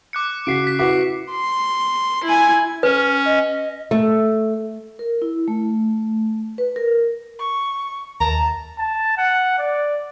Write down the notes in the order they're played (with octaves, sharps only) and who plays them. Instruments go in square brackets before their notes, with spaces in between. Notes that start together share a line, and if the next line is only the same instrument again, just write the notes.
[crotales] D6 F#6 C#7
[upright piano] C#3 F#4 [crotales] B6 C7 D7
[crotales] B6
[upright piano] E4 F#4 B4 [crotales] D6
[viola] C6
E4 G#5
[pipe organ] C#4 [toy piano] B4
[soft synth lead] D#5
[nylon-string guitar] A3
[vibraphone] A#4
E4
A3
B4
A#4
[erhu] C#6
[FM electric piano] D#2 [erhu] A5 [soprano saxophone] A#5
[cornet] A5
F#5
D5